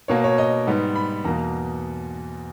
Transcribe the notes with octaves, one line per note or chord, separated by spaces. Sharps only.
B2 A#3 C#5
C#5
D#5
G#2 G3 B3
B5
E2 B2 A#3 A#5